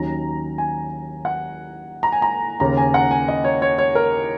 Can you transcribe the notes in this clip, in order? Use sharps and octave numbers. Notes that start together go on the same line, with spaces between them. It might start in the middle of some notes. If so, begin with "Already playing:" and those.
Already playing: D#2 D#3 F#3 C#4 A#5
G#5
F#5
A#5
G#5
A#5
D#2 C#3 A#3 C#4 A#5
G#5
F#5
G#5
D#5
C#5
C#5
C#5
A#4